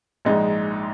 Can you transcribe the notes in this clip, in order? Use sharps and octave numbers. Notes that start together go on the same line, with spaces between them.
A#1 G#2 G#3 D#4